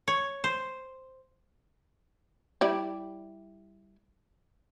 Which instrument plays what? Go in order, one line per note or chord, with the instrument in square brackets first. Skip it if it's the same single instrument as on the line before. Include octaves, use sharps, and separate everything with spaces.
[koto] C#5
C5
[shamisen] G3 E4 D5